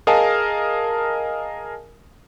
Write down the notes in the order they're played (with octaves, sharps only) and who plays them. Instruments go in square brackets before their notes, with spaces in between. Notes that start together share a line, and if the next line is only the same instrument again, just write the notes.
[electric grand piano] G#4 A#4 D#5 F5 G#5 A5